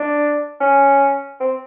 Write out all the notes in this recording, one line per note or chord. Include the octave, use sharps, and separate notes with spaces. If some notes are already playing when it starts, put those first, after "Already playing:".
Already playing: D4
C#4
C4